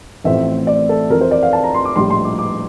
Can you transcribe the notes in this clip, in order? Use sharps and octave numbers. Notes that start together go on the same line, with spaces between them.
A1 A2 F3 A3 C4 E5
D5
A4
F2 E3 A3 A#4
C5
D5
F5
A5
A#5
C6
D6
A#1 A2 G3 C6
C6
D6
D6